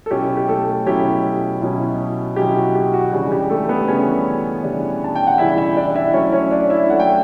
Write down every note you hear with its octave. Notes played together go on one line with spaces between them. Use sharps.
A4
B2 F#3 C#4 E4 G4
G4
A3 A4
B2 F#3 C#4 E4 G4
B2 F#3 C#4 E4
B2 F#3 C#4 E4 G4
F#4
G4
F#4
C#3 E3 G3 D4 G4
G4
A3 A4
B3 B4
C#3 E3 G3 C#4 D4 C#5
C#3 E3 G3 D4
A5
G5
F#5
C#3 E3 G3 D4 E4 E5
E4 E5
D4 D5
E4 E5
F#3 A3 C#4 E4 C#5
C#4 C#5
D4 D5
E4 E5
F#3 A3 E4 F#5
G5